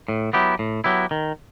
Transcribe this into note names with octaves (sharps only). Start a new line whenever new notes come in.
A2
F#3 B3 E4 G4
A2
F#3 B3 E4 G4
D#3